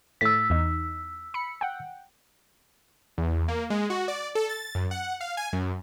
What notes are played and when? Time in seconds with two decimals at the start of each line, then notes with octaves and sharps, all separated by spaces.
0.21 A2 A3 E6 A6 B6
0.50 E2 D#4
1.34 B5 C#7
1.61 F#5 G5
3.18 E2
3.48 A#3
3.70 G#3
3.90 F#4
4.08 D5
4.35 A4
4.49 A6
4.75 F#2
4.91 F#5
5.21 F5
5.37 G#5
5.53 F#2